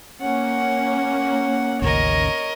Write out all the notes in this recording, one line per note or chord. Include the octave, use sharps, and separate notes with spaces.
A#3 C#4 F#5
A1 D#2 C#3 A#4 C#5 D#5